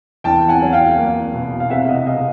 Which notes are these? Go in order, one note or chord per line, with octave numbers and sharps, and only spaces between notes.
E2 G5 A5
F#5 G#5
F#3
F5 G5
A#3
B2
F5
C3 E5 F#5
D#5 F5
C3 D#5 F5